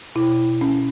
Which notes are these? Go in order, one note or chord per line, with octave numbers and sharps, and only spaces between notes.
B2 E4
C#4